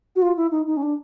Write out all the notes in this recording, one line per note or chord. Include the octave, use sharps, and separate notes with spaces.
F#4
F4
E4
D#4
D#4
C#4
D4